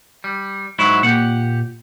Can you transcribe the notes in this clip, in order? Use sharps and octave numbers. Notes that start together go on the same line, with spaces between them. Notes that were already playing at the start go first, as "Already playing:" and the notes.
G3
G#2 F#3 E4 C#6
A#2 G4 F#5